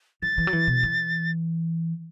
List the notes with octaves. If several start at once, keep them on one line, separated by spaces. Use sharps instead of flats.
E3 A6
E3
F#3
E3
B2
E3